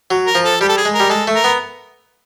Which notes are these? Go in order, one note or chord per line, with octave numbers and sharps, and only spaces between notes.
F#3
A#4
F3
A4
G3 G4
A4
G#4
G#3
A#4
G3
G#3 A4
A3
A#4
B3